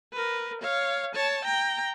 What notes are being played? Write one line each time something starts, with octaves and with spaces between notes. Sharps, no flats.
A#4 B4
C#5 F5
C#5 A5
G5 A#5